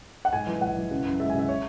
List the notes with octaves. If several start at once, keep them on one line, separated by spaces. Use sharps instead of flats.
F#5
G#2 G#5
E3
A#1 F#5
E3
C#3
F#2
G#3 E5
G#5
C#3 E5
C#5